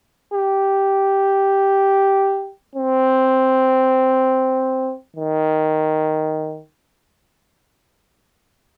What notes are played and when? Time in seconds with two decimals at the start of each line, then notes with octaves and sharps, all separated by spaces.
0.34 G4
2.76 C4
5.17 D#3